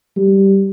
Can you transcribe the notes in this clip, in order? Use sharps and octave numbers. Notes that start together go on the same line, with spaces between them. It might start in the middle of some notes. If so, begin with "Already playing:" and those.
G3